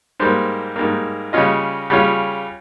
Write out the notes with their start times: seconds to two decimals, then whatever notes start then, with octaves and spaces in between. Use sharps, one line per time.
0.20 G#2 G3 A#3 C5
0.76 G#2 G3 A#3
1.33 C#3 G3 C#4 F4 D#5
1.90 C#3 G3 C#4 F4